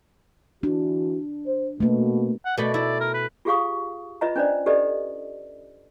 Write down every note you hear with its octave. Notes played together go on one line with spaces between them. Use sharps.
E3 D4 F#4
C5
B2 A3 A#3
F#5
B2 A3 D5 B5
E4 D5
A#4
B4
F4 G4 G#4 F5 C#6 D#6
F4 B4 D#5 E5 A#5
C#4 D4 B4 C5 D5
G4 A4 B4 D5 D#5